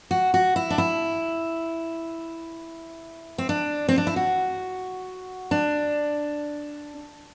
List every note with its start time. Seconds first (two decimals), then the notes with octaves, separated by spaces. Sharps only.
0.11 F#4
0.34 F#4
0.56 E4
0.70 D4
0.78 E4
3.38 C4
3.49 D4
3.89 C4
3.98 D4
4.07 E4
4.16 F#4
5.51 D4